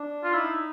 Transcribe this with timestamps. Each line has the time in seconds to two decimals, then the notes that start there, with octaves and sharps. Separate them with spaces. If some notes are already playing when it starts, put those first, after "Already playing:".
Already playing: D4
0.24 F4
0.33 D#4 E4